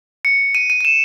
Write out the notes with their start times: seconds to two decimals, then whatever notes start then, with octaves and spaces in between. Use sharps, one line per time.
0.25 C#7
0.55 D#7
0.70 D#7
0.81 D#7
0.85 E7